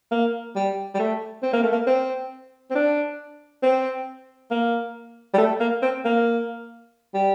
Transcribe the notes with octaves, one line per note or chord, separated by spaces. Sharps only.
A#3
G3
G3
A3
C4
A#3
A3
A#3
C4
C4
D4
C4
A#3
G3
A3
A#3
C4
A#3
G3